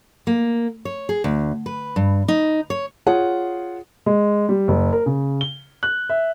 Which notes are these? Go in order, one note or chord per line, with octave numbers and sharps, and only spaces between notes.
A#3
C#5
G#4
D2
B4
G2
D#4
C#5
F4 G#4 C#5 F#5
G#3
G3
F#1
A#4
C#3
G7
F#6
E5